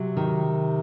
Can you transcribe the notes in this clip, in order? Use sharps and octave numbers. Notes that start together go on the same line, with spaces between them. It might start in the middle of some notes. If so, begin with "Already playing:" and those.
Already playing: C3 F#3
D#3